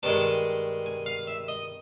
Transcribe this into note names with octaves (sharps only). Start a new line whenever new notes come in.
G2 D#3 G#3 A5
G#5
F5
E5
D#5